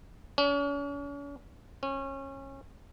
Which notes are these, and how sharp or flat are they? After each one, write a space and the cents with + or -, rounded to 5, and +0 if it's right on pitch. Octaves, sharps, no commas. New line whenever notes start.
C#4 +40
C#4 -25